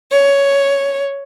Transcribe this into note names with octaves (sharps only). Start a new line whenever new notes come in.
C#5